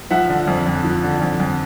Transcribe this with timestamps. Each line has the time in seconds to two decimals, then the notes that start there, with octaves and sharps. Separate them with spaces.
0.11 F3 E5 F#5
0.29 D3
0.47 F2
0.67 F2
0.84 F3
1.03 D3
1.21 F2
1.40 F2